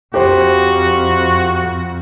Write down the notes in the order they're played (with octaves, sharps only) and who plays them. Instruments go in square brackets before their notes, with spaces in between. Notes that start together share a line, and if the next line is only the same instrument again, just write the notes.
[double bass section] F2 [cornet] F#4 [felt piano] G4 C5